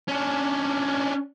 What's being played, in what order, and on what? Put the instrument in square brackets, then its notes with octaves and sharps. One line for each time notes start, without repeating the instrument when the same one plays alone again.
[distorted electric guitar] C#4 D4